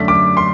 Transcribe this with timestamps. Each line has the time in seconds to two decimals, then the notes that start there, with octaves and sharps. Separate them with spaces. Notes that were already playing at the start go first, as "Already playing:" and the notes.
Already playing: F#2 D3 A3 D4 B6
0.08 D6
0.37 C6